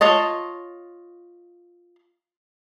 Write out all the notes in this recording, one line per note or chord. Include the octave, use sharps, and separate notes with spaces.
F4 C#5 D#5 A5